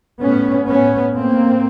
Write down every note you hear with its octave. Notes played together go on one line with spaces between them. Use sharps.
A2 B3 C#4
A2 B3 C#4
A2 A#3 C4